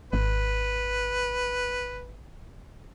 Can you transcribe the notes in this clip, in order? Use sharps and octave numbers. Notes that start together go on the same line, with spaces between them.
G#1 B4